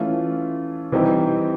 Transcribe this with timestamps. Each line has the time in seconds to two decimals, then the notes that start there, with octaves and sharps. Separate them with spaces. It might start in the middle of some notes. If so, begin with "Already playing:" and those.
Already playing: E3 A3 C#4 F4
0.92 E3 G3 C4 D#4 G4